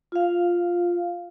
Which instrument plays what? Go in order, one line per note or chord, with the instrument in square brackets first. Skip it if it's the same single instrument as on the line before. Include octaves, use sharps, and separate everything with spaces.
[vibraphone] F4 F5